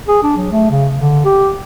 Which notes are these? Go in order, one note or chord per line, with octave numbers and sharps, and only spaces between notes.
G#4
D4
F#3
A3
C#3
D3
G4